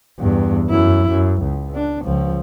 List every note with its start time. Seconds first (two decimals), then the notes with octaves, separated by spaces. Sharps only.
0.19 E2 G2
0.70 F#2 E4
1.09 F#2
1.42 C#2
1.74 D4
2.04 C#2 F3